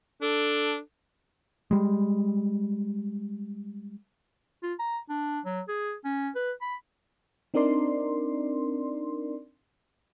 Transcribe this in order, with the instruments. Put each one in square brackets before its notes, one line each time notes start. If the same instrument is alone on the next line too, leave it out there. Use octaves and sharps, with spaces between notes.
[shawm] D4 [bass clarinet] A4
[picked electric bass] G3 G#3
[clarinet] F4
A#5
D4
F#3
G#4
C#4
B4
B5
[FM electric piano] C4 D4 D#4 A#4 D5 C6